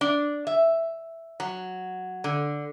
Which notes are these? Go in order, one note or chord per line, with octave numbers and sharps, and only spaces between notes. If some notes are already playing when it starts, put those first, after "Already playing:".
D4
E5
F#3
D3